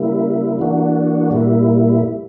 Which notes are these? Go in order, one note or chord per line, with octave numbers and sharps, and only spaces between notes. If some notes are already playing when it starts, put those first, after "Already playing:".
Already playing: C#3 G3 A#3 E4
E3 A#3 D4 F#4
A#2 G3 A#3 E4